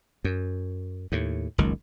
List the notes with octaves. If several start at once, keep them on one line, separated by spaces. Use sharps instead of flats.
F#2
D#2 A2
F#1 C#2 D#3